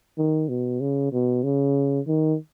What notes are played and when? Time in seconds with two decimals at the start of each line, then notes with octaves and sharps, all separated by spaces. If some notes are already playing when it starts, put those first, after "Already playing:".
0.18 D#3
0.49 B2
0.81 C#3
1.12 B2
1.43 C#3
2.07 D#3